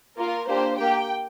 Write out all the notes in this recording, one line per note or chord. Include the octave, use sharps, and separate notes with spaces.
A#3 F4 A#4
A#3 D4 G4 C5
A#3 G4 G5